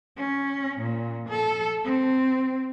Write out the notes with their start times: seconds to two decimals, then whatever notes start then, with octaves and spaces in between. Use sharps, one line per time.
0.17 C#4
0.81 A#2
1.29 A4
1.84 C4